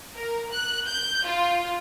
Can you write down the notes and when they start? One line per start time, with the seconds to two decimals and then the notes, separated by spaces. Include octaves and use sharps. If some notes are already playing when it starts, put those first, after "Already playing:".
0.16 A#4
0.51 F#6
0.87 G6
1.27 F4